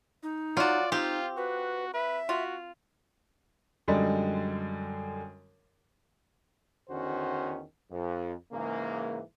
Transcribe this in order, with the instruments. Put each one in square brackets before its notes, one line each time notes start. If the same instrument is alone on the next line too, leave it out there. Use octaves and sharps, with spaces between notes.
[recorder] D#4
[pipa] F#3 F#4 [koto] F4 [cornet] D5
[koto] C4 [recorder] D#4 [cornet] F4 [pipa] G4
[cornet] F#4 [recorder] B4
[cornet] B4 [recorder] E5
[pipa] F4 [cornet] F#4
[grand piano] F#2 D3 G3 G#3
[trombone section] E2 D3 D#3 C#4 F#4 C5
F2
G#2 C#3 E3 A#3